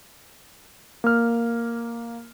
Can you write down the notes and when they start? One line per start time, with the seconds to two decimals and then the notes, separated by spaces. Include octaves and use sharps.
1.04 A#3 F6